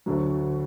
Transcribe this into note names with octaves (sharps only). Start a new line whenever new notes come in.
D2 D3 F#3